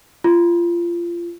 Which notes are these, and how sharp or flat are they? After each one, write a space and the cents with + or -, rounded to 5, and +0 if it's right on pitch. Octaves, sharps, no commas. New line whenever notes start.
F4 -25